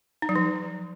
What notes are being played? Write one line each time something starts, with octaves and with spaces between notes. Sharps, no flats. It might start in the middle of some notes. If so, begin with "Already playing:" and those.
D#4
F#3
F3